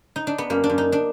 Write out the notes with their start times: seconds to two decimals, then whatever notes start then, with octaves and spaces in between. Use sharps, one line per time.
0.16 D#4
0.27 D4
0.38 B3
0.50 F#2 A#3
0.64 D4
0.70 F#2
0.78 D#4
0.92 D4